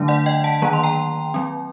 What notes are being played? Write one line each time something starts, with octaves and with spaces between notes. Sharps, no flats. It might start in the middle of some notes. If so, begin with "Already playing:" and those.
Already playing: D3 F#3 A3 D4
D5 F#5
D#5 G5
F#5 A5
D#3 F#3 A#3 A#5
C6
G5 A#5
F#3 C4